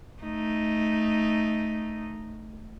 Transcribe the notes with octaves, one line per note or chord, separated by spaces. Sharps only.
A3 D#4